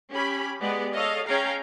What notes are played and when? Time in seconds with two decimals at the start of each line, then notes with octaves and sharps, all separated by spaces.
0.12 C#4 G4 B5
0.61 G#3 B3 G4 D5
0.94 A4 C#5 D#5 F5
1.27 C#4 G#4 F5 G5 A#5